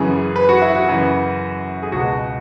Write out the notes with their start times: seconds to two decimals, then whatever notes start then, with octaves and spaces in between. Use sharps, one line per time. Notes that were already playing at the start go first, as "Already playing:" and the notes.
Already playing: F#2 C#3 E3 G#4
0.36 B4
0.49 F#4
0.62 E4
0.75 F#4
0.88 F#2 C#3 E3
1.83 G#4
1.92 C#2 B2 F#4